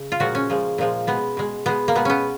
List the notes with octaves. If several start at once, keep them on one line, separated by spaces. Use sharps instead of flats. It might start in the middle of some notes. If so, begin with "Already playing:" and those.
Already playing: C#3
F4
A#2 F3 G#3 F#4
C#4
A#2 F3 G#3
A#2 F3 G#3
B2 G#3 B3
B2 G#3
B2 G#3 B3
A#3
B2 G#3 B3
B3 C#4